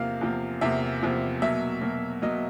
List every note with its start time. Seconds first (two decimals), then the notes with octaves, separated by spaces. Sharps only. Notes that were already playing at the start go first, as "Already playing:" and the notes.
Already playing: E2 C3 F3 A#3 F5
0.21 E2 C3 F3 A#3
0.61 E2 C3 F3 A#3 E5
1.02 E2 C3 F3 A#3
1.42 B2 F#3 A#3 E5
1.82 B2 F#3 A#3
2.22 B2 F#3 A#3 D#5